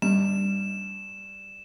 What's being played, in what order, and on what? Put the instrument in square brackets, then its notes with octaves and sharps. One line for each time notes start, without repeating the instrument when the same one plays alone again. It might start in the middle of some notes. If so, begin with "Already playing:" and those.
[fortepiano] G2 [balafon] G3 [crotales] E7